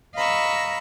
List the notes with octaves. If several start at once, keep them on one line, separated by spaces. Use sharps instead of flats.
D#5 F5 A#5 B5 C#6 E6